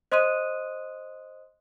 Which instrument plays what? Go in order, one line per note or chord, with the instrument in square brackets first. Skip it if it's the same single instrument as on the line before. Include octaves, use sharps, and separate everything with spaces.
[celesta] C5 D#5 C6 D#6 F#6 D#7